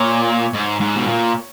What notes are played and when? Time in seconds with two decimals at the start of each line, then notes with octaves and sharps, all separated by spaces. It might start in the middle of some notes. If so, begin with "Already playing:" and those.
Already playing: A#2 C#5
0.53 G#2
0.80 G#2
0.96 B2
1.07 A#2